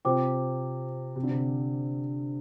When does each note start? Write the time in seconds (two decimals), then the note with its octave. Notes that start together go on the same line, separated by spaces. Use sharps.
0.05 C3 F4 C5 G5 D6
1.16 C3
1.24 D3
1.31 C3